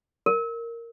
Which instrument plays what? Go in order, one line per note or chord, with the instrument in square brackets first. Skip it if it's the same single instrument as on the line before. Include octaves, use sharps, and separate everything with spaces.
[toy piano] A#4